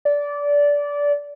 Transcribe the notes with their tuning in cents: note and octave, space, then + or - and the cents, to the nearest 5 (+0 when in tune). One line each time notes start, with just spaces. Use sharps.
D5 -20